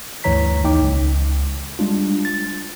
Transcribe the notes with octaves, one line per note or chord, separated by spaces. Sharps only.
D2 G2 E3 C#5 A#5 B6
A#1 D#2 D#4 G5 D6
C#2
G3 G#3 D4 F4
A6